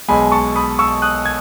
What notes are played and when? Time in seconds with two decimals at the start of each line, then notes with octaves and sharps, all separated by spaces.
0.08 B1 B2 G#3 G#5 B5
0.32 A5 C#6
0.56 B5 D#6
0.79 C#6 E6
1.02 D#6 F#6
1.25 G#6